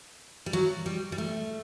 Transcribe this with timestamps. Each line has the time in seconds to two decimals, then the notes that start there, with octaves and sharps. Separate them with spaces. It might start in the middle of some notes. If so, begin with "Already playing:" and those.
0.46 G3
0.53 F#3
0.86 G3
1.12 G3
1.18 A3